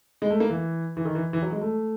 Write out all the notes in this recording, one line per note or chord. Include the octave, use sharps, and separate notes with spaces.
G#3
A3
A#3
E3
E3
D#3
E3
E3
F#3
G#3
A3